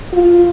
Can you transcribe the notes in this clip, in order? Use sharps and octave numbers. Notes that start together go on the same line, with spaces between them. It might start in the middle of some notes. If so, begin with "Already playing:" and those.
F4